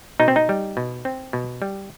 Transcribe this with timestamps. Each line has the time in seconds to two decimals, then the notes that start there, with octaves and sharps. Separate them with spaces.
0.20 B2 D#4
0.28 C4
0.36 D#4
0.49 G3
0.77 B2
1.05 C4
1.33 B2
1.62 G3